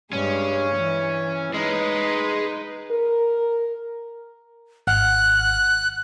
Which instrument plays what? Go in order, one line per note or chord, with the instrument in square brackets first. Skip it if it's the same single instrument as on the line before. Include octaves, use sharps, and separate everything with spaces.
[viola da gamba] G2 G#3 [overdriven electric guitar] C#4
[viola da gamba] E3
[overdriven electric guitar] G#3 [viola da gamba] D#4 B4
[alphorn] A#4
[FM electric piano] G#1 F#5 F6 [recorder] F#6